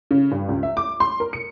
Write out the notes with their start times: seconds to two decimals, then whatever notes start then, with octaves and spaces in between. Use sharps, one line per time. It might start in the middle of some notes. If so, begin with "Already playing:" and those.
0.11 C#3
0.31 G2
0.49 C#2
0.63 E5
0.77 D6
1.00 C6
1.20 A#4
1.33 C#7